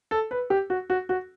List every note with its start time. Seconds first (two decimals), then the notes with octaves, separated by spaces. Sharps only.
0.11 A4
0.31 B4
0.50 G4
0.70 F#4
0.90 F#4
1.09 F#4